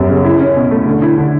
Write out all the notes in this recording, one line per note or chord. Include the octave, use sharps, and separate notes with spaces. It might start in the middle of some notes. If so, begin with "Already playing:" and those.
Already playing: F#2 G3 B3
C#3
E4
C#4
B2
A3
D3
E4
D3